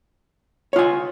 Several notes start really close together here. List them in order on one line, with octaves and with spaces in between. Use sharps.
C#5 F4 G#5